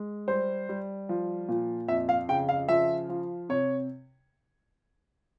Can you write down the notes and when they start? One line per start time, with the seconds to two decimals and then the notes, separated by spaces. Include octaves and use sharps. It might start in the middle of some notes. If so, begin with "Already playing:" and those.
Already playing: G#3
0.28 G3 C5
0.69 G3
1.09 F3
1.48 A#2
1.88 F2 E5
2.09 F5
2.29 C#3 G5
2.49 F5
2.69 F3 E5
3.09 F3
3.49 C3 C#5